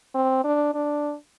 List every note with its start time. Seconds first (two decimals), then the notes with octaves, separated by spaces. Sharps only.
0.14 C4
0.44 D4
0.74 D4